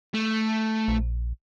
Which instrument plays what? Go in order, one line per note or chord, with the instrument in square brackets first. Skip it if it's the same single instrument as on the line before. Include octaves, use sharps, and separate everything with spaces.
[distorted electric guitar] A3
[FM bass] A#1